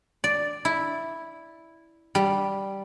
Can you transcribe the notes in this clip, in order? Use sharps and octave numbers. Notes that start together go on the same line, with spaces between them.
D5
E4
G3